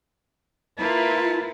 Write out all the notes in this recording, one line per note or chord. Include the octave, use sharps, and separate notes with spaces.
A#3 E4 F4 B4 A5